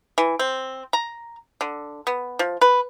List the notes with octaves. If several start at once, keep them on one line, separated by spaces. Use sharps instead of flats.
E3
C4
A#5
D3
B3
F3
B4